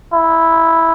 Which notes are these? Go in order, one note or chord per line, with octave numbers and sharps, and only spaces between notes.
E4